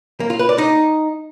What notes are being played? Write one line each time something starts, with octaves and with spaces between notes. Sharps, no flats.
A#3
F4
B4
D5
D#4